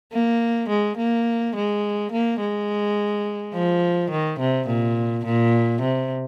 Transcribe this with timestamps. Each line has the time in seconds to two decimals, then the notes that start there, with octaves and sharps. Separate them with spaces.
0.13 A#3
0.69 G#3
0.98 A#3
1.55 G#3
2.12 A#3
2.40 G#3
3.53 F3
4.11 D#3
4.40 C3
4.67 A#2
5.25 A#2
5.81 C3